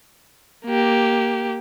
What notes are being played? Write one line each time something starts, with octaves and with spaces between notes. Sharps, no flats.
A#3 G4